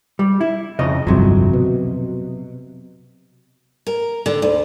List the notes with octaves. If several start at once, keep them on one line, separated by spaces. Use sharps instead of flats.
G3
E4
F2 C#3 D#5
G1 C2 F2 C3 F#3
B2
A#4
D3
D2